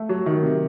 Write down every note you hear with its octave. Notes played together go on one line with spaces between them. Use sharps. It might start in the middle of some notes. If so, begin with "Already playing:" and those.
Already playing: A3
F#3
D#3
C3